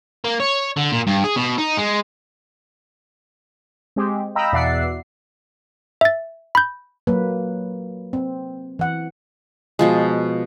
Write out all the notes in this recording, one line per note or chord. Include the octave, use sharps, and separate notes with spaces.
A#3
C#5
D3
A#2
G2
G#4
B2
D#4
G#3
G#3 C4 G4
D#5 F5 G5 A#5 B5 E6
E2 B2 D5 E5 F#5 C7
E5 A6
B5 G6
F#3 A#3 B4
C4
E3 F#5
B2 F3 G#3